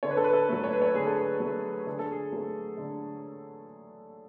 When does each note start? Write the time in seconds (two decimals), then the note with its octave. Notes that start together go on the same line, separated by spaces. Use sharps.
0.03 D3 C#5
0.11 B4
0.17 A4
0.24 B4
0.33 A4
0.49 F#3 A3
0.64 C#5
0.73 B4
0.82 C#5
0.94 D3 G#4
1.07 A4
1.17 G#4
1.40 F#3
1.45 A3
1.87 D3 G#4
1.99 A4
2.11 G#4
2.32 F#3 A3
2.77 D3